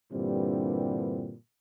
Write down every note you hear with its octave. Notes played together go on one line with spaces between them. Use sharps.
G2 A#2 D3 E3 G3 C4